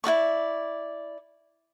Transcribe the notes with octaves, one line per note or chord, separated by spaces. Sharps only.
E4 F#4 D5 C#6